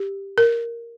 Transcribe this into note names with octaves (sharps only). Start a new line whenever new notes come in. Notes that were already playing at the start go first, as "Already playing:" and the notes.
Already playing: G4
A#4